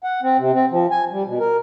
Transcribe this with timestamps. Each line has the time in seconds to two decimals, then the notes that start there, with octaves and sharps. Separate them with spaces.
0.04 F#5
0.22 C4
0.38 C3
0.54 C4
0.71 F3
0.91 G#5
1.11 G3
1.26 B2
1.40 A#4